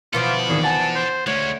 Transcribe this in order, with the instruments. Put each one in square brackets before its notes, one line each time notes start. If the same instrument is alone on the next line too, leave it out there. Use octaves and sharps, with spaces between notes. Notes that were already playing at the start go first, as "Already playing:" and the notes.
[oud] B2 E3 F3 [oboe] F4 [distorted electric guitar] A4 D5
[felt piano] G#1 D#2 [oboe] G#4
[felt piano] F#5 G#5 [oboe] A5
[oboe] C5
[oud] D2 [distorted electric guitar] G#3 C#4 [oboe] C#5